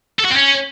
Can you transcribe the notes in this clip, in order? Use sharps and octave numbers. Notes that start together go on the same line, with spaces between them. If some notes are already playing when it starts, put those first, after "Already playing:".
A4
F#4
C4
C#4